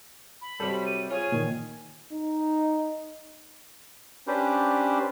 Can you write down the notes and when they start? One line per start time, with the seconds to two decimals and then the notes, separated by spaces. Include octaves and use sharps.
0.41 B5
0.60 C3 F#3 G3 A4 C5
0.86 D#7
1.10 F4 G#4 C#5 G#5
1.32 A#2 D#3
2.13 D#4
4.27 C#4 D4 G4 B4 C5